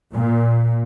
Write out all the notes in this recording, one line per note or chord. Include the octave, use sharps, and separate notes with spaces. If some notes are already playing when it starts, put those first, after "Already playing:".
A#2